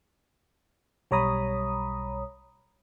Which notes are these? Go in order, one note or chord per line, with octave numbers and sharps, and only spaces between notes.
B1 G3 C#5 A#5 B5 D#6